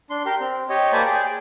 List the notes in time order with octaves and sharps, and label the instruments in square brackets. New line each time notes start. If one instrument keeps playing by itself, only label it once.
[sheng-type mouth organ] D4 C6
G4 A#4 C6
C4
G4 C#5 D#5
A#3 C5 D5 G#5 A5 B5
G#4 D5 G5